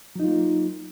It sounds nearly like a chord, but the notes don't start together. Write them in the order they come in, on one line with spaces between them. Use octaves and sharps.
F#3 D#4 F4 A#3